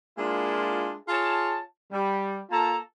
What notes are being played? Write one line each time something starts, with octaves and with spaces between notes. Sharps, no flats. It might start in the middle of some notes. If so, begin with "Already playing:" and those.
G#3 A#3 D4 E4 F4
F4 G#4 C#5 A5
G3
A#3 F4 A4 A5 A#5